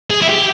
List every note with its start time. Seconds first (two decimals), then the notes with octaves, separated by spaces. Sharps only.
0.11 G#4
0.22 E4
0.29 G4